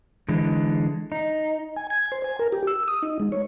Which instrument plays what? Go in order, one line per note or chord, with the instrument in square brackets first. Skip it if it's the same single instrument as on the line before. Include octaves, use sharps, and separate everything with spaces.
[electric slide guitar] D3 E3 G#3
D#4
[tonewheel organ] G#5
G#6
C5
G#5
A#4
G4
E6
D#6
D#4
G#3
C#5